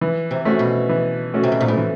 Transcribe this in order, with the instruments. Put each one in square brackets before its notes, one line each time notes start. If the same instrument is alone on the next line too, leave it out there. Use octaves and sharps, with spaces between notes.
[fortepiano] E3
[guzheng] C3
[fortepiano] A3 C#4 F#4
[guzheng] B2
[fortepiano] E3
A3 C#4 F#4
[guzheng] C3
B2
A#2
A2
[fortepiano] E3